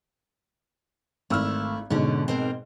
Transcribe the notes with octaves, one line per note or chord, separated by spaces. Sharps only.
G#1 A3 E4 E6 F6
G#2 B2 D3 C#4
C4 A#4 C5